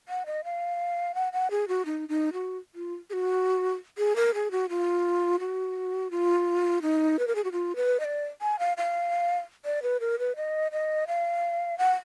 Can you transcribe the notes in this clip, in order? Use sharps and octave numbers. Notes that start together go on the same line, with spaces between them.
F#5
D#5
F5
F#5
F#5
G#4
F#4
D#4
D#4
F#4
F4
G#4
F#4
G#4
A#4
G#4
F#4
F4
F#4
F4
D#4
B4
A#4
G#4
F#4
F4
B4
D#5
D5
G#5
F5
F5
D5
B4
A#4
B4
D#5
D#5
F5
F#5